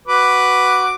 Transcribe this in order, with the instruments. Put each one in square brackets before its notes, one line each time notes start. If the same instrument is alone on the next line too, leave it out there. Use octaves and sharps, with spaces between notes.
[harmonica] F#4 B4 D6